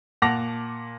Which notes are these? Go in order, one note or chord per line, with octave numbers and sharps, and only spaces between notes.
A#2 F#5 A5 D6 A#6 F7